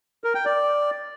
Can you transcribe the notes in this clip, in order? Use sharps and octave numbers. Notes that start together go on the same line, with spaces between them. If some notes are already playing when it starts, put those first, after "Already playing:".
A#4
G5
D5